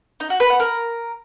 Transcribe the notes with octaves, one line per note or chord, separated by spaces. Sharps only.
D#4
F#4
B4
F#5
A#4